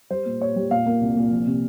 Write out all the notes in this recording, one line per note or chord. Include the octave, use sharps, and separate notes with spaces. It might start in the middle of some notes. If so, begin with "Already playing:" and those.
G3 C5
A#2
A#2 C#5
G3
A#2 F5
A#3
C2
A#2
F3
C3